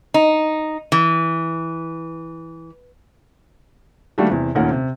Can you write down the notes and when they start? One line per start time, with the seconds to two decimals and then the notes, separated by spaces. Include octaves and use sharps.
0.14 D#4
0.92 E3
4.18 D#3 G3 A3 A#3 D4 F#4
4.30 E2 C3
4.55 D#2 A#2 A3 C#4 A#4 F#5
4.71 C3